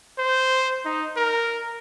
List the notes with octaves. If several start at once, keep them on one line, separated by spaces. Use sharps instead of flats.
C5
D#4
A#4